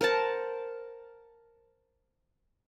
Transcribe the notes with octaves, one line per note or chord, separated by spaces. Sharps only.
A#4 C5 F#5 A5